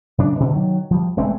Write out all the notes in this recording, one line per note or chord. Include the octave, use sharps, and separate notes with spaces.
F#2 C#3 D4
B2 D3
D#3 F#3
F3 G3
E1 G#3 A3 C4